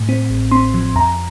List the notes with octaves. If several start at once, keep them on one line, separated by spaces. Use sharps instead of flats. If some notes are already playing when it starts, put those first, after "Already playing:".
Already playing: A2
C4
A1
C4 C6
F3
F2 A#5